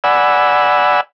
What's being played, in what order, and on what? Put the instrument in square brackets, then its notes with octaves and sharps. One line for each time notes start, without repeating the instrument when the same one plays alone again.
[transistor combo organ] D5 F#5 G#5 B5 E6